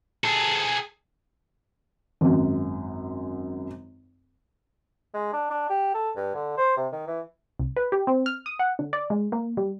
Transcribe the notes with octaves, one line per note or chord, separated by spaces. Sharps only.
G#4 A4
G#1 F#2
G#3
D4
D4
G4
A4
G2
D3
C5
C3
D#3
E3
C2
B4
G4
C4
F6
D#6
F#5
D3
D5
G#3
A#3
G3